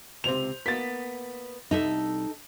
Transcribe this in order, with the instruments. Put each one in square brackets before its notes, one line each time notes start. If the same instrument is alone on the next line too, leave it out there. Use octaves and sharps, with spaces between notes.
[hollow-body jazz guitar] C#2 C3 [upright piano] C5 F7
[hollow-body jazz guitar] A#3 B3 [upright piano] A6 B6
[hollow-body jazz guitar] C2 E5 [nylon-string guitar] D#4 A4